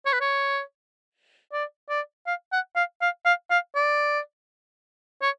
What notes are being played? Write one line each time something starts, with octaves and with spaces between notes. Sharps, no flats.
C#5
B4
C#5
D5
D5
F5
F#5
F5
F5
F5
F5
D5
C#5